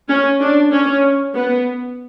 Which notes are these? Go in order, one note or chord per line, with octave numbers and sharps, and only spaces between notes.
C#4
D4
C#4
B3